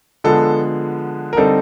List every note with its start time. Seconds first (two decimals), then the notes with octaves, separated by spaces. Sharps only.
0.24 D3 F3 G#3 B3 A4
1.33 A#4
1.36 D3 G3 C4 D#4 A4